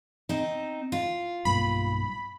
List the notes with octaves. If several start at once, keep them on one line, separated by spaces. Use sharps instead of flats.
C4 D#4
F4
B1 G2 A#3 B5